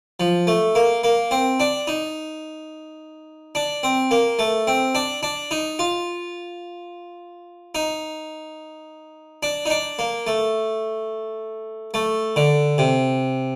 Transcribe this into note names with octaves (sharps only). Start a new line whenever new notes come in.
F3
A3
A#3
A#3
C4
D4
D#4
D4
C4
A#3
A3
C4
D4
D4
D#4
F4
D#4
D4
D#4
D4
A#3
A3
A3
D3
C3